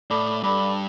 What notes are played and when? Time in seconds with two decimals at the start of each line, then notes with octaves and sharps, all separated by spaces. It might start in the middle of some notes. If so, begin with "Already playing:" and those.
0.10 A2 A4 D5 B5 D6
0.43 G2 A4 D5 B5 D6